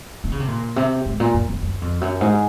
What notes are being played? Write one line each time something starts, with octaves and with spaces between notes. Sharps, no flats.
D#3
C#3
C3
A#2
C3
G#2
A#2
F#2
F#2
F#2
F2
F#2
G#2